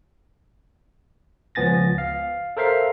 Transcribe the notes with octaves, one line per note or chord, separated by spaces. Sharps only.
C#2 F3 B3 G#5 A6 A#6
F5
A4 A#4 C5 E5 F5